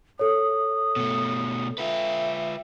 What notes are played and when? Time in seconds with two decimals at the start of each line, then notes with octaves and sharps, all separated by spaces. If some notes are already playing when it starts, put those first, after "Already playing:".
0.19 A4 C#5 D#6
0.96 B2 A3
1.78 F4 B4 E5 G5